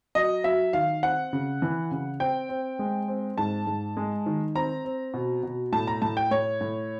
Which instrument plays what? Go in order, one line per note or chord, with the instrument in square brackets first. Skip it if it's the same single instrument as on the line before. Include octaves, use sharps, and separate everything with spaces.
[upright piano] F#3 D#5
F#3 E5
D#3 F5
C4 F#5
C#3
E3
C#3
C4 G5
C4
G#3
C4
G#2 A5
G#2
G#3
D#3
C4 A#5
C4
B2
B2
A2 A5
A#5
A2 A5
G5
A2 C#5
A2